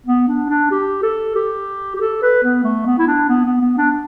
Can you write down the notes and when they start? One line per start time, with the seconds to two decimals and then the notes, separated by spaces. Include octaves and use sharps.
0.06 B3
0.28 D4
0.49 D4
0.71 G4
1.03 A4
1.35 G4
1.96 G4
2.01 A4
2.22 B4
2.44 B3
2.64 A3
2.86 B3
2.99 E4
3.08 D4
3.29 B3
3.45 B3
3.61 B3
3.78 D4